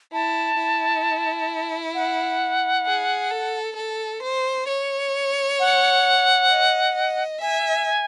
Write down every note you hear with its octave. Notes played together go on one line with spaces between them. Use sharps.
E4 A5
E4
F#5
G#4
A4
A4
C5
C#5
F#5
D#5
D#5
E5 G#5